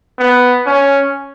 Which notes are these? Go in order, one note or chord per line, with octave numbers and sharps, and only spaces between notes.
B3
C#4